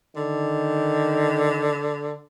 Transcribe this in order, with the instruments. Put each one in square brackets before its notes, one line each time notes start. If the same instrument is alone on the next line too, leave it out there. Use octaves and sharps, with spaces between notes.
[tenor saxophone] D3 [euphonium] D#3